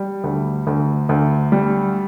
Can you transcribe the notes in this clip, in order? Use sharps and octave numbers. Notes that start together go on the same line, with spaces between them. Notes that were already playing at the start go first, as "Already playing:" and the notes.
Already playing: G3
D2
D2
D2
G3